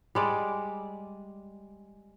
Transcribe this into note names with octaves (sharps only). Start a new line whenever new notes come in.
G3 G#3 D5